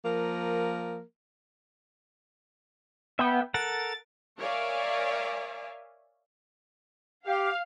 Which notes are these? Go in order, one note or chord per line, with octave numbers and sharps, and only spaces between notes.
F3 A#3 A#4
B3 E5 G5
A4 A#4 F#5 A6
A#4 C#5 D5 E5 F5 G#5
G4 F5